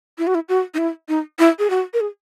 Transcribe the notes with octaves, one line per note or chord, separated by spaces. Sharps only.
E4
F#4
E4
F#4
D#4
E4
D#4
E4
G#4
F#4
A#4
G#4